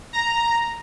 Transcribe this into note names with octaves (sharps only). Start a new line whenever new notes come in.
A#5